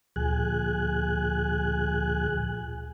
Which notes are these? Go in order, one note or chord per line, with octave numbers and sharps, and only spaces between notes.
D2 A#2 F3 G#4 G#5 F#6